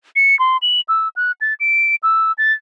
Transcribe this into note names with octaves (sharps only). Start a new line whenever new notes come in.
C#7
C6
F#7
E6
F#6
A6
D7
E6
A6